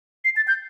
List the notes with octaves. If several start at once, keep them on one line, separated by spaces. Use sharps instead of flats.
C7
A6
G6